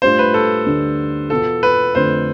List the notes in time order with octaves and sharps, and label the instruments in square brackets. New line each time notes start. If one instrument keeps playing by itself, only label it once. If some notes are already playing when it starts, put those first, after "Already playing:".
[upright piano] A2 G3 D4 F4 [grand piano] C5
[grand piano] B4
A4
[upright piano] D2 D3 G3 D4
[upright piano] E2 B2 B3 F4 [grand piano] A4
[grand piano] B4
[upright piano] F2 D3 A3 D4 F4 [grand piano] C5